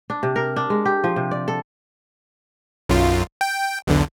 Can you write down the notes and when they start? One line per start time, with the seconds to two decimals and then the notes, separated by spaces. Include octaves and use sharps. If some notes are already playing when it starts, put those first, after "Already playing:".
0.10 D4
0.23 C3
0.36 A#4
0.56 D4
0.70 G#3
0.85 G4
1.04 F3
1.16 C3
1.31 D5
1.48 A4
2.89 B1 F#2 F4
3.41 G5
3.87 B1 E2 D3